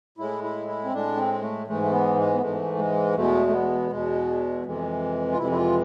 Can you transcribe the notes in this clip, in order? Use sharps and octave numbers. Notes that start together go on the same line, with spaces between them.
A2 G#3 E4
E4
E4
C4
A2 G#3 D4
C4
A3
G#2 E3 G#3 A3
A3
B3
G#3
B3
G#2 E3 G#3 A3
G#3
E2 B2 G#3 A3
A3
B3
E2 B2 G#3
F2 C3 E3 G#3
F4
F2 C3 E3 G#3 E4
E4
F4